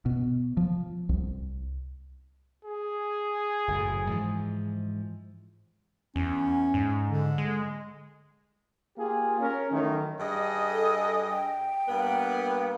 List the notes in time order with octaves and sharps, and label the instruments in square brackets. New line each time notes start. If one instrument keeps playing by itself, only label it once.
[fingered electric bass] B2
F3
C2
[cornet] G#4
[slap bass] F#1 A2
G#2 E3 F3
[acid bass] E2 [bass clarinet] C#4
[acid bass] G#2
[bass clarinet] D3
[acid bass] G#3
[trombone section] A#3 F4 G4 G#4
C#4 A#4
D#3 E3 F#3 A3
[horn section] G2 G#4 D#5
[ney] A4
G5
[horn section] G2 A#3 B3